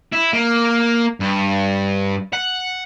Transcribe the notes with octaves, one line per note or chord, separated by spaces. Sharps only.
E4
A#3
G2
F#5